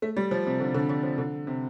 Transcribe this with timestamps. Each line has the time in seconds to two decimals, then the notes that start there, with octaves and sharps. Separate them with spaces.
0.02 A3
0.17 G3
0.31 F3
0.46 C3
0.60 D3
0.74 D3
0.90 D3
1.03 F3
1.18 D3
1.47 C3